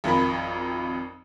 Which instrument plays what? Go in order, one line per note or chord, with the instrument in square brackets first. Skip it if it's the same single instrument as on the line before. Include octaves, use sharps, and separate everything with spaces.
[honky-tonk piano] G#1 F2 A#4 B5